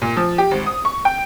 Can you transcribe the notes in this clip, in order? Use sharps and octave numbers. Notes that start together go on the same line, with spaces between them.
A#2
F3
G4
G#1
D#6
C#6
G5